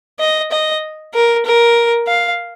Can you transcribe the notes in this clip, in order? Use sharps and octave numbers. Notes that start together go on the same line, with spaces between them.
D#5
D#5
A#4
A#4
F5